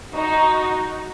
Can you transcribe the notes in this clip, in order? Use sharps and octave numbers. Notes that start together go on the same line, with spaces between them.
D#4 F#4